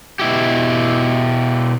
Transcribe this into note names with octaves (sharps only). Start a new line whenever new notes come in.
B2 E4 G4